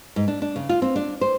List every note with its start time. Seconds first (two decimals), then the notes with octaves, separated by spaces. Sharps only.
0.16 G#2
0.28 D4
0.42 D4
0.56 C#3
0.69 F4
0.82 C4
0.96 D4
1.21 C5